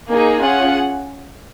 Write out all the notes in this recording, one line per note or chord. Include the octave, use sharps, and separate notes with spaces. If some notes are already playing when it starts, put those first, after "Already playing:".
A#3 D#4 G#4
C#4 F4 G#4 F#5